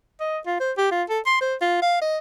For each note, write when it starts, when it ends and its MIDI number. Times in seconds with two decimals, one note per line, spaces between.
0.20 0.38 75
0.46 0.59 65
0.60 0.72 72
0.78 0.89 67
0.91 1.03 65
1.10 1.20 69
1.26 1.36 84
1.41 1.55 72
1.61 1.82 65
1.82 2.00 77
2.02 2.18 75